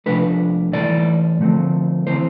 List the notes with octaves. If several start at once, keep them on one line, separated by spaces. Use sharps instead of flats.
C3 F3 A3 D4 B4
A2 E3 A3 D5
D3 F3 A3 C4
E3 A3 C4 C5